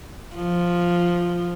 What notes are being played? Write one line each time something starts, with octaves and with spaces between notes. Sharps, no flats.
F3